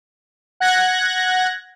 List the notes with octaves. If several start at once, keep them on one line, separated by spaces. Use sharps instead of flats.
F#5 F#6 G#6 A#6